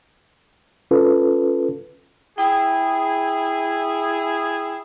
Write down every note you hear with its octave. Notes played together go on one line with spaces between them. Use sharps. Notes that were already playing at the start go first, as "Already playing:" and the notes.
C#4 F4 A4 B4
E4 G#4 G5